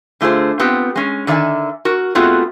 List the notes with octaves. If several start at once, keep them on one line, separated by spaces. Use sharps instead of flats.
D3 A3 F4 G#4 C5
B3 C4 F4 G4
G#3 C#4
D3 D#3 D5 E5 F5 G#5
F#4 A#4
A3 B3 C4 F4 F#4 G#4